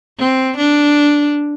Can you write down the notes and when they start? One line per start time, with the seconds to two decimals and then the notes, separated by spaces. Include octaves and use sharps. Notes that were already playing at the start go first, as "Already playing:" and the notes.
0.19 C4
0.57 D4